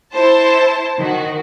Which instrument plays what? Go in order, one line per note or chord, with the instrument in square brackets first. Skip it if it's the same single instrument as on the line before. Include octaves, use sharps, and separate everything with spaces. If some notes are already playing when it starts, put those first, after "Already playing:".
[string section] E4 C5 A5
D#3 F#4